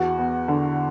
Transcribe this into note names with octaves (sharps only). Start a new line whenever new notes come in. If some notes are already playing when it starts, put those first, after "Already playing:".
Already playing: E2 F#4
B3
D3